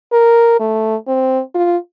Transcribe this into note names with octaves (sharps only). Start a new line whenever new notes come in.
A#4
A3
C4
F4